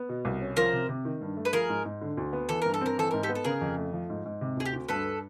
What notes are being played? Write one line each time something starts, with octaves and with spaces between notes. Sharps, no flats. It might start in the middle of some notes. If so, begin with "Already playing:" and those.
Already playing: B3
B2
C2
C#4
F3 A#4 C5
C3
C3
D#3
G2
A3
B4
F3 G#4 A#4
G#2
G#2
D3
D2
B3
E3 A4
G2 A#4
A4
C4 A#4
E3 A4
G#2 A#4
G4 A4
B3
A4
C#3 G#4 A#4
F2
A3
F3
G#2
G#2
C3
D2 G#4
G4
D2
G2 A4 B4